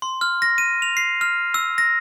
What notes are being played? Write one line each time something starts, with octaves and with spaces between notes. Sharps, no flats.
C6
F6
A#6
D#7
F7
C7
F6
E6
A#6